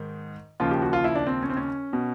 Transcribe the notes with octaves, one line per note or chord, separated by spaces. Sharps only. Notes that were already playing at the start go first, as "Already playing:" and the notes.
Already playing: G#2 D#3
D#2 C#3 F3 F4
G4
F#4
F4
E4
D4
C4
C#4
C4
C#4
B2